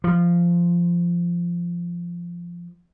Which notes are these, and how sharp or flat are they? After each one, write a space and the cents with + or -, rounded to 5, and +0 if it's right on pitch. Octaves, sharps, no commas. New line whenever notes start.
F3 -10